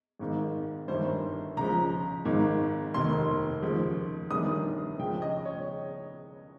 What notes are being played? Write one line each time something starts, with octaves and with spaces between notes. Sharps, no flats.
G#1 G#2 D#3
G1 G2 D#3 C5
C#2 C#3 F3 A#5
G#1 G#2 D#3
F1 D#2 D#3 C6
D#2 C#3 F3
G1 G2 D#3 D#6
C#2 C#3 F3 G5
D#5
C#5